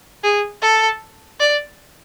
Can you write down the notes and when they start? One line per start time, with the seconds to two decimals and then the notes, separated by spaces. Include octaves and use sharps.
0.24 G#4
0.62 A4
1.40 D5